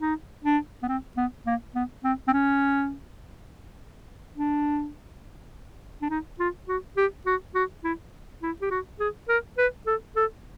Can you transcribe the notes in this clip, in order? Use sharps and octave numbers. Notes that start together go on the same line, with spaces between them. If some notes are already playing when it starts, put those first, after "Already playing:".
D#4
D4
B3
C4
B3
A#3
B3
C4
C4
C#4
D4
D4
D#4
F4
F#4
G4
F#4
F#4
E4
E4
G4
F#4
G#4
A#4
B4
A4
A4